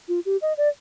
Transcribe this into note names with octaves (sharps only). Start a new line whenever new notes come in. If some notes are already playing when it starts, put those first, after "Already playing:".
F4
G4
D#5
D5